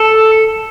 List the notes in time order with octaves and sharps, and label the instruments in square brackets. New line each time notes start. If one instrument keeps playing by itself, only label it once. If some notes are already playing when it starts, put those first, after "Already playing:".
Already playing: [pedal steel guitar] A4